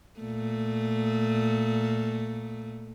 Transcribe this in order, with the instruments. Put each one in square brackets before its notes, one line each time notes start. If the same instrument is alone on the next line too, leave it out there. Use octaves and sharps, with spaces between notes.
[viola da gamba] A#2 A3